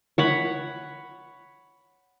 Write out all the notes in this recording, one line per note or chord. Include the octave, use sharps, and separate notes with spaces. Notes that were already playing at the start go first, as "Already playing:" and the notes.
C#5 F#5 B5